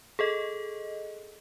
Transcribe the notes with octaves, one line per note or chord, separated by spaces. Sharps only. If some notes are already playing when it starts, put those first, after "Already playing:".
G#4 A4 D#5